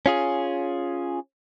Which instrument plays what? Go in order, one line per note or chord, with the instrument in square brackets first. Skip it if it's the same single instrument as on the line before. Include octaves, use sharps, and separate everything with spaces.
[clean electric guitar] C#4 F4 G#4